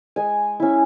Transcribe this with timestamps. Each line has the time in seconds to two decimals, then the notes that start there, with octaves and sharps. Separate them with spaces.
0.16 G#3 G#5
0.60 C#4 E4